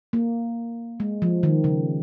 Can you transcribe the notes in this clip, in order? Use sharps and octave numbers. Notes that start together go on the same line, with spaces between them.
A#3
G#3
F3
D#3
C#3